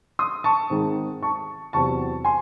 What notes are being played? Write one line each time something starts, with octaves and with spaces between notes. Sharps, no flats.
C6 D#6
A5 C#6
G#2 D#3 G#3 C4
A5 C#6
E2 C3 F#3 C4 A5 C#6
G#5 C6